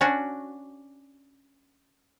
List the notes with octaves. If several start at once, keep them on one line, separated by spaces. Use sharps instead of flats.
C#4 D4 F#4